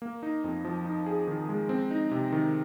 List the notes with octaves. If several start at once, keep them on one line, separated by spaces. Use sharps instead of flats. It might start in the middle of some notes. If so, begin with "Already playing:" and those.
A#3
D#4
F2
F3
D#4
G#4
D#3
G#3
C4
D#4
C3
D#3